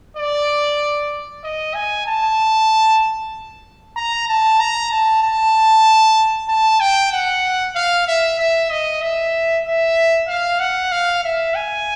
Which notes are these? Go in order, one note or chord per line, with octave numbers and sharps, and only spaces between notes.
D5
D#5
G#5
A5
A#5
A5
A#5
A5
A5
A5
G5
F#5
F5
E5
E5
D#5
E5
E5
F5
F#5
F5
E5
G#5